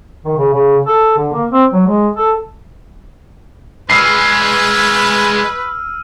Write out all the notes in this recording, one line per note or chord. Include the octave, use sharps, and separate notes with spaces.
D#3
C#3
C#3
A4
D3
A#3
C4
F#3
G#3
A4
E3 G#3 B4 E6 F6 C7 D#7